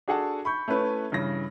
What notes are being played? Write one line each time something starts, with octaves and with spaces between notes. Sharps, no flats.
D4 F#4 G#4 A4 F#5 A5
B5 C#6 G6
A3 C#4 E4 B4 C#5
G2 C#3 E3 A#6